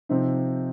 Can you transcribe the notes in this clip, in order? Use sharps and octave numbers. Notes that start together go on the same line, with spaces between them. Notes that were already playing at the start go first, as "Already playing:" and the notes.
C3 F3 C4 D#4